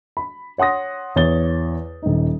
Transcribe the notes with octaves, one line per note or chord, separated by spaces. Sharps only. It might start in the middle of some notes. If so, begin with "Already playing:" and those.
B5
C#5 F#5 C6 D#6 A#6
E2 C#5 A6 G7
D#1 D#4